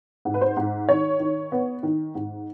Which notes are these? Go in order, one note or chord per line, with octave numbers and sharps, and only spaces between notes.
G#2
B4
C5
G#2
D#3 C#5
D#3
B3
D#3
G#2